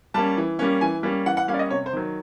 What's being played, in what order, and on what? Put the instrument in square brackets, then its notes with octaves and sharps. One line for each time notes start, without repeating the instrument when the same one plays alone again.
[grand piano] G3 A#3 C#4 A5
E3
G3 A#3 C#4
E3 G#5
G3 A#3 C#4
E3 F#5
F#5
G3 A#3 C#4 F5
D5
D#5
C3 C#5
C5
D#3 F#3